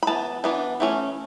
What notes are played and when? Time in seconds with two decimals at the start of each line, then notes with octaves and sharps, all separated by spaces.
0.03 B5
0.07 E3 B3 A5
0.44 E3 B3 D4
0.80 E3 A3 C#4